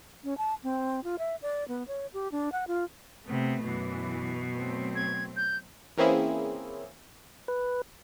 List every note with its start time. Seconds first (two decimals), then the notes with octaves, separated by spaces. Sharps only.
0.24 C#4
0.38 A5
0.63 C4
1.04 F4
1.19 E5
1.42 D5
1.68 B3
1.88 C#5
2.14 G4
2.32 D4
2.52 F#5
2.67 F4
3.25 C3 A3 B3
3.63 F#2 B2 E3
4.54 F#3 A3 C4
4.95 G#6
5.36 G6
5.98 E3 A#3 C4 C#4 E4 G#4
7.48 B4